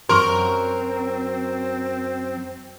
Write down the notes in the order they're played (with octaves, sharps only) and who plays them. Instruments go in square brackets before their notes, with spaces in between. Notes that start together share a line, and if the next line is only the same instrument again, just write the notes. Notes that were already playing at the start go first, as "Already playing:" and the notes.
[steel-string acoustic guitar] F#2 F#3 [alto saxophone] C4 [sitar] A#4 [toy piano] C6 C#6